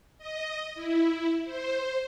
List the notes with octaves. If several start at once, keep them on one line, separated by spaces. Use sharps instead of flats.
D#5
E4
C5